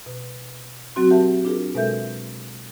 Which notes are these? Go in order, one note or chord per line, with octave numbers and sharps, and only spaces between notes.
B2
F#3 C4 F#4 C6
G4 A#4 E5 F#5 A5
D4 F4 G#4 A#4
B2 G#3 A4 A#4 E5 G6